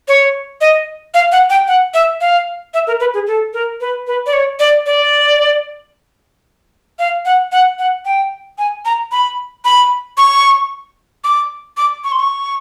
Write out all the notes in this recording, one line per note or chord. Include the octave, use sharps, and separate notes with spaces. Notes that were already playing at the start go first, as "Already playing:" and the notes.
C#5
D#5
F5
F#5
G5
F#5
E5
F5
E5
A#4
B4
G#4
A4
A#4
B4
B4
D5
C#5
D5
D5
F5
F#5
F#5
F#5
G5
G#5
A#5
B5
B5
C#6
D6
D6
C#6
C6
C#6